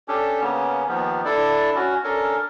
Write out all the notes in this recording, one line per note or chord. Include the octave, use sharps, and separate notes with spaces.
C#4 D4 G4 A4
C#3 A#3 B3 C#4
D#2 F3 B3
D4 E4 A4 D5
C#4 F#4
C#4 D4 A4 A#4